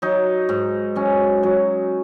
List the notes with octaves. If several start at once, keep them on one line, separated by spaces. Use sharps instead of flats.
F#3 D#4
G#2
F#3 C#4
F#3